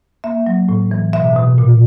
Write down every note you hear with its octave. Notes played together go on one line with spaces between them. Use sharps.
A#3 E5
F#3
A2
E3
B2 E5
B2
A#2